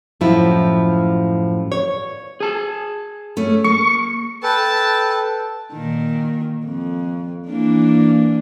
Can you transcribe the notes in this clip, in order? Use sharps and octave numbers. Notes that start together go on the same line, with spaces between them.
F#2 A2 F3 E4
C#5
G#4 A5
A3 C#4
A#3 C#6
A4 B4 G5 A5
A#2 D#3
F2
E3 A#3 D4